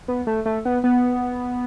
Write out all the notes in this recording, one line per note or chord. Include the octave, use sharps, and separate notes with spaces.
B3
A3
A3
B3
B3